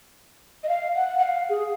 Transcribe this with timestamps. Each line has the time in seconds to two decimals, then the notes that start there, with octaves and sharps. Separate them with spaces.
0.63 D#5
0.68 F5
0.95 F#5
1.18 F#5
1.22 F5
1.49 G#4